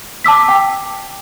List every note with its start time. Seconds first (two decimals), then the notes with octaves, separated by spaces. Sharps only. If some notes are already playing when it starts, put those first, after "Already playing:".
0.24 A5 D6 E6 B6
0.48 G5